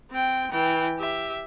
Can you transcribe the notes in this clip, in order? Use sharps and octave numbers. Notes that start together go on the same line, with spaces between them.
C4 G5
E3 G5
G4 E5